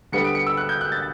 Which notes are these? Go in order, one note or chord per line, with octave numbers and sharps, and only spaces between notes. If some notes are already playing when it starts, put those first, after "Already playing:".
D3 G3 B3 C#7
D7
C#7
E6
F#6
G6
F#6
A6